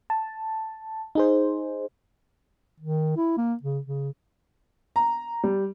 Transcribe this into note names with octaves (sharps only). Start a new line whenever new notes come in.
A5
D#4 G#4 C5
D#3
E4
A#3
C#3
C#3
A#5
G3